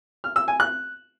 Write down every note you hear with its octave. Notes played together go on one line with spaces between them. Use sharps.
F6
E6
G#5
F#6